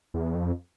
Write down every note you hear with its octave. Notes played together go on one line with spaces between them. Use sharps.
E2
F2